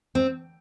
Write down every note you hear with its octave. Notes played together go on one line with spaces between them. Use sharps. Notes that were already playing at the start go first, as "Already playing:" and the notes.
C4